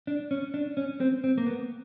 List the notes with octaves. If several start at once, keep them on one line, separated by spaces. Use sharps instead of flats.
D4
C#4
D4
C#4
C4
C4
A#3
B3